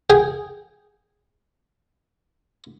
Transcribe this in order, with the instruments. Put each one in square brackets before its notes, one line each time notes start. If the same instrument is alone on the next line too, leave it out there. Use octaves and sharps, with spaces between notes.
[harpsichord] G#4 G5